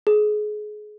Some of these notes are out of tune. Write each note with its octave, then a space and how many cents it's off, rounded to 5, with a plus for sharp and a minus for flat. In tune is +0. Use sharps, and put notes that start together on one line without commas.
G#4 +25